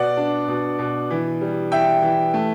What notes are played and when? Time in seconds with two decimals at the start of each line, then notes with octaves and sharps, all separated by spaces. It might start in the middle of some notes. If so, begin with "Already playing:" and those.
Already playing: B2 D5 F#5
0.17 D4
0.48 B2
0.79 B2
1.10 E3
1.41 G3
1.72 E3 E5 G5
2.02 E3
2.34 A3